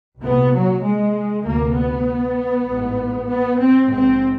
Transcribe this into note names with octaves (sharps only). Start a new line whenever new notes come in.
C2 A#2 B3
F#3
G#3
D2 C3 A#3
B3
A1 G#2
B3
C4
A#1 G#2 C4